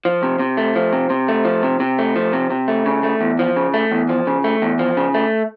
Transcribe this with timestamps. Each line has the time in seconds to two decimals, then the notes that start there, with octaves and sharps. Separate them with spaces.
0.05 F3
0.23 C3
0.39 C3
0.57 A3
0.76 F3
0.93 C3
1.10 C3
1.28 A3
1.45 F3
1.63 C3
1.80 C3
1.98 A3
2.16 F3
2.33 C3
2.50 C3
2.68 A3
2.86 C#3
3.03 A3
3.21 E2
3.39 F3
3.56 C#3
3.74 A3
3.91 E2
4.09 F3
4.27 C#3
4.44 A3
4.62 E2
4.79 F3
4.97 C#3
5.14 A3